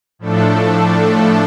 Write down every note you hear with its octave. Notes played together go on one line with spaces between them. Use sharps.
A2 F3 A3 D4 A4